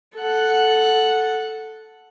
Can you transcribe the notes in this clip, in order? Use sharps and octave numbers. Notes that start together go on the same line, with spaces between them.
A4 F#5